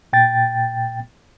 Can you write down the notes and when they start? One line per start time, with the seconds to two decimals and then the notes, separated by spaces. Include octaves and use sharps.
0.13 A#2 G5 A6